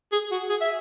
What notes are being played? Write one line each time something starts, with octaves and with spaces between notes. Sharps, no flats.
G#4
F#4
G#4
E5